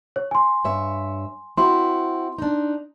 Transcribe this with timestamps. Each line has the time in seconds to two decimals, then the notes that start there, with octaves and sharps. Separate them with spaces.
0.16 C#5
0.31 G#5 C6
0.64 G2 C#5 E5
1.57 C4 E4 F#4 C6
2.38 D4 D#4